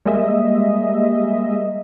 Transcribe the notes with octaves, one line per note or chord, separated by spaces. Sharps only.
G3 G#3 A#3 D#5 E5